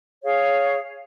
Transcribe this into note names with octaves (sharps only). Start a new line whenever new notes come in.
G#4 C#5 F5